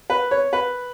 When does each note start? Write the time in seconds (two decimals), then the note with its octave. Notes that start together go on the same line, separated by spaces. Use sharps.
0.10 B4
0.31 C#5
0.53 B4